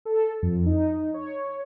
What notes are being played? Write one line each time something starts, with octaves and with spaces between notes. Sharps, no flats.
A4
F2
D#4
C#5